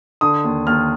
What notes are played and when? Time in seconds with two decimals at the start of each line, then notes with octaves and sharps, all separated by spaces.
0.21 D3 D#6
0.44 D#2
0.67 D#2 F6